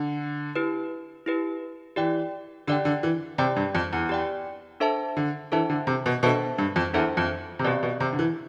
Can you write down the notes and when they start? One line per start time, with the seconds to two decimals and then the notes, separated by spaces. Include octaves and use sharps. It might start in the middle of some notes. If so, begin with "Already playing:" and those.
Already playing: D3
0.55 E4 G4 B4
1.26 E4 G4 B4
1.96 E3 G4 D5 G5
2.67 D3 G4 D5 G5
2.85 D3
3.03 E3
3.38 C3 G4 D5 G5
3.56 G2
3.75 F2
3.93 E2
4.09 G4 D5 G5
4.80 D4 A4 C5 E5 A5
5.17 D3
5.52 E3 D4 A4 C5 E5 A5
5.70 D3
5.87 C3
6.06 B2
6.23 B2 D4 A4 C5 E5 A5
6.58 G2
6.76 F2
6.94 E2 D4 A4 C5 E5 A5
7.17 F2
7.59 C3
7.64 B2 C4 G4 D5
7.83 B2
8.00 C3
8.13 D3
8.19 E3